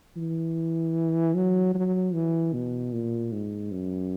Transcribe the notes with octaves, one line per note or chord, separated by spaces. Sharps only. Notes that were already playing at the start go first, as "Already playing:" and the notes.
E3
F#3
F#3
E3
B2
A#2
G#2
F#2